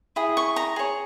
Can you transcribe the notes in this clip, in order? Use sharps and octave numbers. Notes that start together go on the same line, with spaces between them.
E4 G#4
C#6
A#5
G#4 C#5